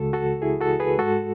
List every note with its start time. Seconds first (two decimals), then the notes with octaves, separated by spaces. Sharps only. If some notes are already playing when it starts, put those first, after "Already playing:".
Already playing: C#2 C#3 G#3 F#4 A4
0.13 F#4 A4
0.42 E4 G#4
0.61 F#4 A4
0.80 G#4 B4
0.98 G#2 G#3 F#4 A4